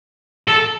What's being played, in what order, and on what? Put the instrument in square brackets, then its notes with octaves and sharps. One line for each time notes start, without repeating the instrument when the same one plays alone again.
[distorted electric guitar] A4